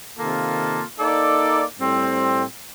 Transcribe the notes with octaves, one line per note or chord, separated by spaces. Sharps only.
C3 D#3 A#3 F4 A4
A#3 D#4 A4 D5
A2 G3 C4